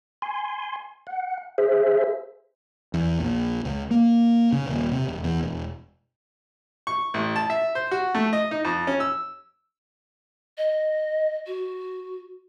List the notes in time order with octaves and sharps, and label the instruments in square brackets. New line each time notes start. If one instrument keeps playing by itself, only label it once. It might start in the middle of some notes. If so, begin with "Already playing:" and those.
[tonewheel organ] G#5 C6
F#5
G#4 C5 E5
[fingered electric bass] E2
A#1
C#2
A#3
C#3
D#1
C3
E1
E2
E1
[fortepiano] C#6
A1
A5
E5
C5
F#4
A3
D#5
D#4
F2
C#4
E6
[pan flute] D#5
F#4